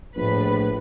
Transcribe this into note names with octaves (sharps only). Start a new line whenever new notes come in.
A#1 A2 B4